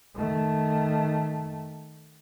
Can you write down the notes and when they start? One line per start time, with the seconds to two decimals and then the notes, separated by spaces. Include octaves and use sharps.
0.15 D#3 A3